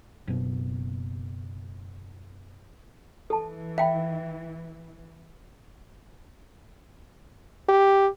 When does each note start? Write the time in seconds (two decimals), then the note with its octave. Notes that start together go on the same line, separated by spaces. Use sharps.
0.28 F#1 B2
3.30 E3 A4 A5
3.78 E5 F5 G5 B5
7.69 G4